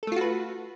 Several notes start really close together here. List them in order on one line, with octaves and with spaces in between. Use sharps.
A4 A3 F4 F#4 B4